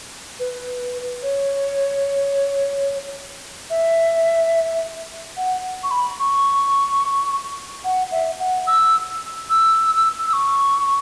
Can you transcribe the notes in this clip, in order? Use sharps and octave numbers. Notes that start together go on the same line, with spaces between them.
B4
C#5
E5
F#5
C#6
B5
C#6
F#5
E5
F#5
E6
E6
E6
C#6